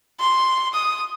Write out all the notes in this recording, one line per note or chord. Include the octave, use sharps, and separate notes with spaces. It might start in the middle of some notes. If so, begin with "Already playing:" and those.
C6
D#6